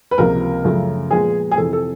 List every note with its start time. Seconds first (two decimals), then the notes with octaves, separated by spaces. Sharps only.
0.11 B4
0.18 C#2 C3 F3 A#3 A#4
0.65 F#2 C#3 F3 A3
1.11 A#2 F3 G#3 B3 G#4
1.51 G#4
1.57 F2 C3 E3 A4
1.73 A4